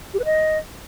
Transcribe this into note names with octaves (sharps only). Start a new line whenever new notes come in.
G4
B4
D#5